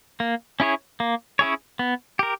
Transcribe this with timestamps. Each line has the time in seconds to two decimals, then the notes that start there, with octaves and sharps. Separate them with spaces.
0.20 A#3
0.60 C#4 E4 G#4 C#5
1.00 A#3
1.39 C#4 E4 G#4 C#5
1.79 B3
2.19 G4 A#4